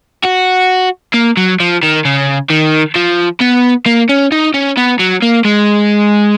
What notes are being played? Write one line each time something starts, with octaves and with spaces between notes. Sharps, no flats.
F#4
A#3
F#3
F3
D#3
C#3
D#3
F3
B3
A#3
C#4
D#4
C#4
B3
F#3
A#3
G#3